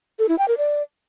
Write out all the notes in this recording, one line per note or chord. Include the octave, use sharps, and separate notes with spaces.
A4
E4
G5
A#4
D5